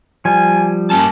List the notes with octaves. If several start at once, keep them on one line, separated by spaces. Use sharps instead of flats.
F3 G3 G#5
G2 A#3 C#4 A5